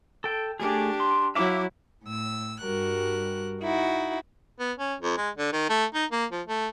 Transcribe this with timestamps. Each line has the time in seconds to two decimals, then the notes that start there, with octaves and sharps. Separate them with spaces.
0.24 A4 G5
0.60 A3 D4 G4 G#4
1.00 C6
1.35 F#3 E4 E5 F5 D6
2.06 A2 E6
2.62 G2 G3 F#4 A#4 F#6
3.62 D#4 E4 F#4
4.59 B3
4.78 C#4
5.00 F2
5.18 G#3
5.37 D3
5.53 D#3
5.69 A3
5.94 D#4
6.12 A#3
6.32 F3
6.47 A3